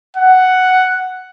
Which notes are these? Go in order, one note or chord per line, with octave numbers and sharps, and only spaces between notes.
F#5